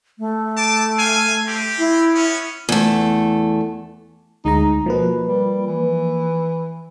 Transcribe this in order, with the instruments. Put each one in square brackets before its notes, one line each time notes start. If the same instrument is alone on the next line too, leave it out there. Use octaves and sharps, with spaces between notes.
[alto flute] A3
[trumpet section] A5 D6
F5 G#5
C4 G4
[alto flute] E4
[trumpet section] B3 C#4
[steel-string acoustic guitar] E2 A3
[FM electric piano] D2 G#3 A#5 [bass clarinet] D#4
[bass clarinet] B2 [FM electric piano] F3 A#3 B4
[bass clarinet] G3
E3